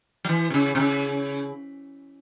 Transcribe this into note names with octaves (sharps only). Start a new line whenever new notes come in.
F#3
E3
C3
C#3
C3
C#3